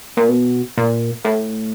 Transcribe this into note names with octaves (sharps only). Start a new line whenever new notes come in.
A#2
B2
A#2
A2